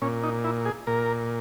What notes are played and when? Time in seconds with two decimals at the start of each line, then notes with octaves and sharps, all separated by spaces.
0.02 A#2 C#4
0.24 D#4
0.45 E4
0.65 G#4
0.87 A#2 A#4